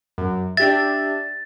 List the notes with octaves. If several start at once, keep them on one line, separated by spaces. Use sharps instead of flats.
F#2
D4 G4 E5 A6